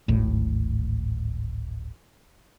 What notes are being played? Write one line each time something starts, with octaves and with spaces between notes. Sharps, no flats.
D1 G#1 A2